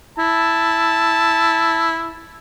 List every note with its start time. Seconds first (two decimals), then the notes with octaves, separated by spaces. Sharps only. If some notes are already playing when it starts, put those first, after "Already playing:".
0.19 E4 A5